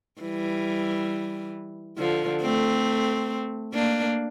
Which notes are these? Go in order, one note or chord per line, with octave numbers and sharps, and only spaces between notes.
E3 G3
D3 F3
A3 C4
A#3 D4